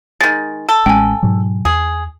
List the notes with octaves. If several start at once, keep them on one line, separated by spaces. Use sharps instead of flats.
D#3 G#3 A6
A4
A1 G#3 C#4 G5 G#5
G#2 B2 F#3
E2 G#4